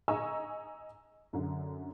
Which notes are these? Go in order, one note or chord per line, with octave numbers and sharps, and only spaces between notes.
D#5 G#5 A#5 C#6 E6
F#2 D3